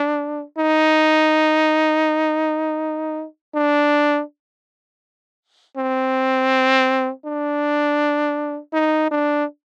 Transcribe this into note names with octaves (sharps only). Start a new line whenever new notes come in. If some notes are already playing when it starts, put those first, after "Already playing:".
Already playing: D4
D#4
D4
C4
D4
D#4
D4